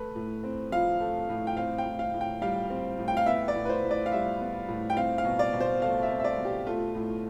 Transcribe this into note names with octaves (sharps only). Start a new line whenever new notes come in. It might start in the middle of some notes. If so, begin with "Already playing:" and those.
Already playing: A3 B4
A2
C4
F3 F5
A3
A2
G5
C4 F5
G5
A2
F5
A2
G5
G3 F5
C4
A2
G5
F5
B3 E5
D5
A2
B4
C5
A2
D5
F5
G3 E5
B3
A2
G5
C4 F5
F5
B2
D5
B2
C5
A3 F5
E5
C4
E5
D5
B2
G4
A3 F4
A2